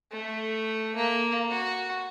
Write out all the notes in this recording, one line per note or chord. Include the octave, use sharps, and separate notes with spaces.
A3
A#3
F#4